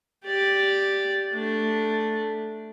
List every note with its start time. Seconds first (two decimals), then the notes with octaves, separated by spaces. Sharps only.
0.25 G4 D5
1.33 A3 D4